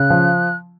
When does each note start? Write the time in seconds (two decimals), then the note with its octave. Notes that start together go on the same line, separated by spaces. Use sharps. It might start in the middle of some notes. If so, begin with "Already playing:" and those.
Already playing: C#3 F#6
0.10 F3